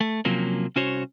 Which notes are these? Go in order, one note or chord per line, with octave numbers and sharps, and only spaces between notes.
A3
C3 F3 F#3 A#3 C#4
C2 C#4 F#4 C5 C#5